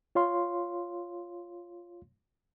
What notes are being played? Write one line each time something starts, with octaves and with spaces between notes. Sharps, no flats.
F4 C#5 F5 C6